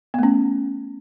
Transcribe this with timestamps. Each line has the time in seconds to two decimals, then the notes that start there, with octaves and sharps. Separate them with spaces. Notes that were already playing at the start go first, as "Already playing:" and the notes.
0.14 B3
0.19 A3
0.23 C#4